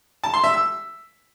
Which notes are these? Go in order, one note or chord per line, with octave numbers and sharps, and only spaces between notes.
A5
C6
E5
E6